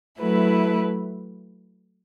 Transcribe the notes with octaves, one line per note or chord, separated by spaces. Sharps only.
F#3 A3 E4 B4